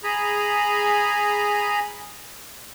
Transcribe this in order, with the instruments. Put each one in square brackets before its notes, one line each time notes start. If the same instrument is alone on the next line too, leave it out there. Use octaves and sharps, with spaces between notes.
[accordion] G#4 G#5 A#5 B5